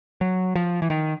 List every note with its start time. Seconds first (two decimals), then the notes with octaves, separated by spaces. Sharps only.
0.21 F#3
0.55 F3
0.82 E3
0.90 D#3